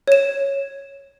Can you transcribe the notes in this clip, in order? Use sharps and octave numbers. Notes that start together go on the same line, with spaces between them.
C#5 E7